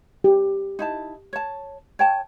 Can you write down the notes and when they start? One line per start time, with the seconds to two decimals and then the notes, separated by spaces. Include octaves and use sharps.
0.24 G4
0.79 D#4 E4 A5
1.33 C#5 A5
1.99 C#5 G5 A5